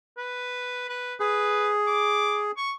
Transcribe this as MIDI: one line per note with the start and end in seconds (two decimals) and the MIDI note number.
0.17 0.85 71
0.89 1.14 71
1.20 2.51 68
1.20 1.71 71
1.87 2.39 86
2.57 2.71 85